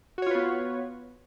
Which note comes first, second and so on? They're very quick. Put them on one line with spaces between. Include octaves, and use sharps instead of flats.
F#4 C#5 F4 B4 B3